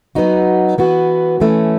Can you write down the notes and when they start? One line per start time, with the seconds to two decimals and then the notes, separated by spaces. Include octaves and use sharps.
0.15 F#3 B3 D#4 F#4
0.78 E3 B3 F#4
1.40 E3 A3 C#4